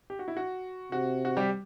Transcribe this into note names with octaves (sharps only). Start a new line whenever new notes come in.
G4
F#4
E4
F#4
C3 F#4
F#4
G3 G4